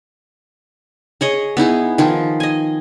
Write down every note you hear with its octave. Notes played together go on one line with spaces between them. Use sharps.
G#4 C#5 D#5
B3 D#4 E4 G#4
D#3 F3 F4
D#5 G#5